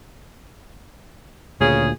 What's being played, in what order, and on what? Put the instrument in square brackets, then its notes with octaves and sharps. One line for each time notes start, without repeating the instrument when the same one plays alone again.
[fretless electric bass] D2 A#2 [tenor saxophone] C#3 [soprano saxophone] G#4